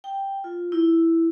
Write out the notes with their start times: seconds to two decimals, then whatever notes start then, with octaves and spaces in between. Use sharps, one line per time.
0.04 G5
0.44 F4
0.72 E4